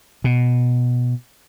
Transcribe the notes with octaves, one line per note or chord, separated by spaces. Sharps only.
B2